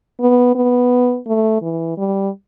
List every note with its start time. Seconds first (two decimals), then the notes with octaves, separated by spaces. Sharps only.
0.20 B3
0.55 B3
1.27 A3
1.62 E3
1.98 G3